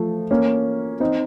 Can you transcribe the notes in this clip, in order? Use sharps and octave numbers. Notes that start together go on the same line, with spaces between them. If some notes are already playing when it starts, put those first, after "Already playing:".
Already playing: F3 A3
A#3 C#4
C4 D#4